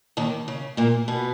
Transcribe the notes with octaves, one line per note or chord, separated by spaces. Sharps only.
D#2 D#3
C#3
A#2 A#3
B2 B3